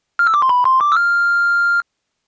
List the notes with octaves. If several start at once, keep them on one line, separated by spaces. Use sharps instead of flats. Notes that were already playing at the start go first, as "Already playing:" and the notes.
F6
E6
D6
C6
B5
C6
D6
E6
F6